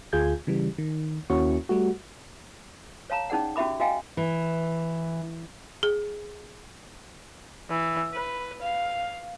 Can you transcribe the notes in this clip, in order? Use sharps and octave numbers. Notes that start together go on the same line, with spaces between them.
D2 F4 G#4 G6 G#6
C#3 E3 G3
D#3
D#2 A#3 C#4 E4 F#4 C#6
G3 A3 F#4
C#5 F5 A5 A#5
C#4 D#4 G#4 D5 F#5
C#4 F#4 G4 E5 B5 D6
F#4 D#5 F5 G5 G#5
E3
G#4
E3
B4
F5